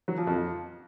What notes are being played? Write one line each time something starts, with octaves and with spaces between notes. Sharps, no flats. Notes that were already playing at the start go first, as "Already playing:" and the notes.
F#3
F3
F2